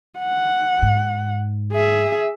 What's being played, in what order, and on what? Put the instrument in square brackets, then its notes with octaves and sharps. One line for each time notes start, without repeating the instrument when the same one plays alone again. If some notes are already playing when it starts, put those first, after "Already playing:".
[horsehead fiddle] F#5
[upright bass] G#2
[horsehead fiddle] G#4 E5